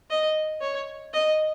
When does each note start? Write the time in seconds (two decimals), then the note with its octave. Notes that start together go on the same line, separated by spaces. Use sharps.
0.10 D#5
0.61 C#5
1.14 D#5